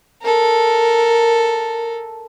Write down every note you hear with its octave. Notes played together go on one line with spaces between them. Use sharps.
A4 A#4